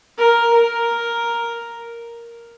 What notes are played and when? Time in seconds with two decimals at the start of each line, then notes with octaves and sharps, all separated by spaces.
0.18 A#4
0.53 A#4